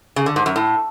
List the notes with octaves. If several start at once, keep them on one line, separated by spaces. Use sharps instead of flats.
C#3
D3
G#2
F#2
A2